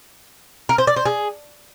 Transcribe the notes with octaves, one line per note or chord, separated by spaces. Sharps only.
A#4
C5
D5
C5
G#4